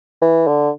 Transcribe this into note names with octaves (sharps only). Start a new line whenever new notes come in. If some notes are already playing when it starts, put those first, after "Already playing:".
E3
D3